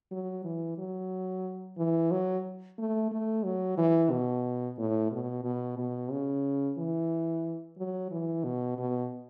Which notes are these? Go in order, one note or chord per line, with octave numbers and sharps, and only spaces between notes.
F#3
E3
F#3
E3
F#3
A3
A3
F#3
E3
B2
A2
B2
B2
B2
C#3
E3
F#3
E3
B2
B2